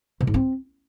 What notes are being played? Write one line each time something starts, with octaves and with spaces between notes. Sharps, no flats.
B2
G#2
C4